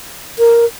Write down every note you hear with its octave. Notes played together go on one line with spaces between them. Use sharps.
A#4